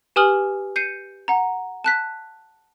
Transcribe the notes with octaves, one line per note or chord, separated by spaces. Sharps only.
G4 B4 G#5 D#6 F6 F#7
G6 C7 C#7 D#7
F#5 A#5
A5 F#6 B6